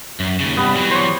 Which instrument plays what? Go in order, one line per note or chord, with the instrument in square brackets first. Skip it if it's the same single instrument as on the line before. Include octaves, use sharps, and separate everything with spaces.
[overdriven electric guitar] F#2
D#2 C#3
[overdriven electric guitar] C2 G2 [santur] G3 B3
[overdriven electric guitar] E3 F#3
[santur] C5 C#5